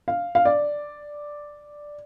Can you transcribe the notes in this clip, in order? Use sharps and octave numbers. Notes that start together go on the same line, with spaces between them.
F5
F5
D5